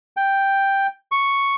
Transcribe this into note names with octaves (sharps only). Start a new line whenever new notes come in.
G5
C#6